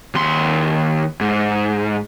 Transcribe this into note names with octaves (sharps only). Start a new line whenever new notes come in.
D#2 C6
G#2